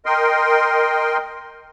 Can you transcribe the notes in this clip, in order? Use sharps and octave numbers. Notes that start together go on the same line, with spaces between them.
A#4 D#5 G5 C6